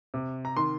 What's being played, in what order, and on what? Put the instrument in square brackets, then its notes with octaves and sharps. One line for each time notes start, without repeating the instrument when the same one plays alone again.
[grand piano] C3
[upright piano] A#5
[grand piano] D#3 [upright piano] C6